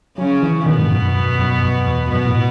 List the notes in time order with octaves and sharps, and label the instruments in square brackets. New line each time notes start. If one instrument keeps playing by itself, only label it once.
[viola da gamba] C#3 C#4 [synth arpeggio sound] F#3
[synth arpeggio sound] E3
[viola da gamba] B2 B3 [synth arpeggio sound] D#3
[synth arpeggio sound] G#2
F#2
F#2
F#2
F#2
F#2
E2
[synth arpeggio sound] F#2 [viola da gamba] B2 B3
[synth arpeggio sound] A2